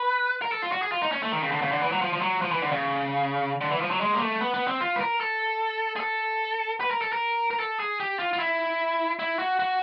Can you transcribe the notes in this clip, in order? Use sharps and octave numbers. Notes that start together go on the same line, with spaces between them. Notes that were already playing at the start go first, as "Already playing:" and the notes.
Already playing: B4
A#4
A4
F4
F#4
G#4
F4
D#4
C#4
A3
D#3
C#3
D3
C#3
D3
E3
F#3
F3
F3
F#3
F3
E3
D3
C#3
D3
E3
F3
F#3
G#3
A#3
A3
B3
B3
C4
F4
B4
A#4
A4
G#4
A4
B4
A#4
A4
A#4
A#4
A4
G#4
G4
F4
F4
E4
E4
F#4
F#4